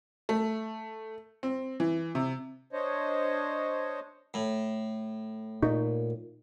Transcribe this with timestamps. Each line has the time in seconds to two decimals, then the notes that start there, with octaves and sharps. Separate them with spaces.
0.29 A3
1.43 C4
1.80 E3
2.15 C3
2.73 D4 C5 C#5 D#5
4.34 A2
5.62 A#2 D#4